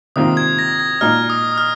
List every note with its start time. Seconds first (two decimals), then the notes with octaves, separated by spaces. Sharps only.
0.16 C3 D#3 A#3 F4 D#6
0.37 G#6
0.59 A#6
0.79 G#6
1.01 A#2 A#3 D#4 F6
1.30 D#6
1.52 D#6
1.58 F6